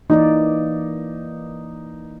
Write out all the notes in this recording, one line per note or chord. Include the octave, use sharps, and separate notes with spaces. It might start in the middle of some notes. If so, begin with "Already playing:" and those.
E3 A#3 D#4 D5